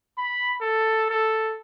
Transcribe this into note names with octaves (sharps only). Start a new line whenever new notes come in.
B5
A4
A4